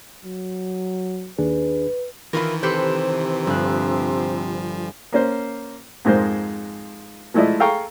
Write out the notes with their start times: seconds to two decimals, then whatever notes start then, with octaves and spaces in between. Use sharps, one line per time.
0.25 F#3
1.38 D#2 D4 G#4 B4
2.33 D#3 E3 E4 F4 A#4
2.63 C3 G4 A4 B4 C5
3.47 G1 F3 F#6
5.13 A#3 C#4 C5
6.05 F2 G#2 G#3 A#4 C5
7.34 F3 G#3 A3 E4 D5 D#5
7.60 G#4 A4 F5 G5 A#5 C#6